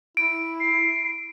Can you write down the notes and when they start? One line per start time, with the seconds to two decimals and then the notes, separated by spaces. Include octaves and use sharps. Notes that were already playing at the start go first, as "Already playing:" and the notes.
0.17 E4 D7
0.60 C7